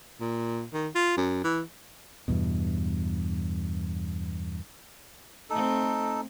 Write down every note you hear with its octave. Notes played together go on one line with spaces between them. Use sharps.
A#2
D#3
F4
F#2
E3
E2 G2 B2
A3 C4 D#4 A4